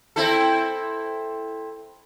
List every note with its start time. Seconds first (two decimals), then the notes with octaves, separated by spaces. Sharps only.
0.16 C4 E4 A4